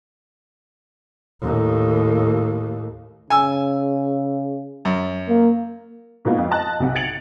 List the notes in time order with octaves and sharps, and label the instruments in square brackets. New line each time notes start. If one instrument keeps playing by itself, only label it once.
[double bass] D#2 A2
[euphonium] C#3 [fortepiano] G#5 E6
[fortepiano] F#2
[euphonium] A#3
[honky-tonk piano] G#2 B2 A#3 B3 F4
F2 F5
D#5 A5 F#6
B1 C3 F#5
G#6 A6 C#7 D7 F7 F#7